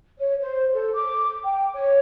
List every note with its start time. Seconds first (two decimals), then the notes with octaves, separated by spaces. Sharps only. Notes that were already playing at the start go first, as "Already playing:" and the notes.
0.19 C#5
0.41 C5
0.73 A4
0.94 D6
1.44 G5
1.74 C#5